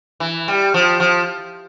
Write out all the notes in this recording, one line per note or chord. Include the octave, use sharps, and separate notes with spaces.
E3
G3
F3
F3